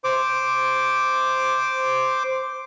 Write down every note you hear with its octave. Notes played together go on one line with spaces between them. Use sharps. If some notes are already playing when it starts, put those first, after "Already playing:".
C5 D6